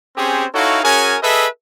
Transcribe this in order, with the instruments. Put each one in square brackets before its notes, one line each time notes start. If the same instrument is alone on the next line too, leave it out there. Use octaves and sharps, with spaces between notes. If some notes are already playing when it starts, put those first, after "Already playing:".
[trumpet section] C4 C#4 G4 G#4 C5
D#4 E4 F#4 A4 C#5 F5
C#4 F#4 G#4 A#4 C#5 G#5
G#4 A4 B4 D#5 E5